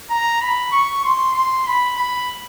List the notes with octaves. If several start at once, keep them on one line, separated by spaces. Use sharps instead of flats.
A#5
B5
C#6
C6
C6
B5
B5